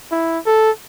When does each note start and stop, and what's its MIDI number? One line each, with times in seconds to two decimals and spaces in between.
0.11 0.39 64
0.46 0.70 69